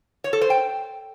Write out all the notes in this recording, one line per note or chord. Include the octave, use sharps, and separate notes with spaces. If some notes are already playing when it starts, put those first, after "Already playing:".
C#5
A4
C5
G5